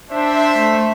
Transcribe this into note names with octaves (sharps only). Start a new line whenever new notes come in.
D4 C5 E5
A3